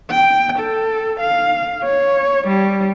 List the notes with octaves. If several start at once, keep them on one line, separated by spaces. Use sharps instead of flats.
G5
A4
F5
C#5
G3